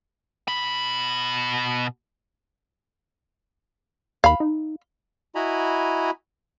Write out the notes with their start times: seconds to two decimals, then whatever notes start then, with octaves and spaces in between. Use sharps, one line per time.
0.48 B2 B5
4.24 D#2 F5 B5
4.40 D#4
5.35 E4 F#4 D#5 G#5 A#5 B5